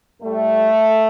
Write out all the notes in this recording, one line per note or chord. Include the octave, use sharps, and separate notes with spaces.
A2 G3 A3